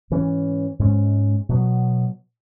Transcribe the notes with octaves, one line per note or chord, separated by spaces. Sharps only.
G#2 E3 C#4
G#2 G#3 C#4
B2 F#3 B3